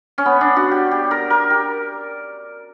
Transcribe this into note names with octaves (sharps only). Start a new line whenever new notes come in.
C#4
B3
D4
F#4
G4
G4
A#4
A#4
G4